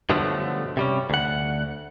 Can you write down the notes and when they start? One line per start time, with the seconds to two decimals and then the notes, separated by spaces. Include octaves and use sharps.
0.10 G2 B2 D3 F3 F#3 A3
0.77 C3 G3 C#4
1.10 D2 F#5